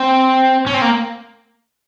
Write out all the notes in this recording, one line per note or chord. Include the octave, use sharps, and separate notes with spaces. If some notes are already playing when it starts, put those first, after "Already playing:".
Already playing: C4
C#4
C4
A#3